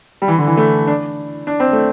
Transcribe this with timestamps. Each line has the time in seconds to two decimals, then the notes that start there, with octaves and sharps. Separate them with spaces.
0.22 G3
0.28 E3
0.38 D3
0.47 E3
0.57 A3
0.87 D4
1.47 D4
1.60 C4
1.73 A3